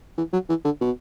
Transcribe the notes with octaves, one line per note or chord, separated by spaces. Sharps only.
E3
F#3
E3
D3
B2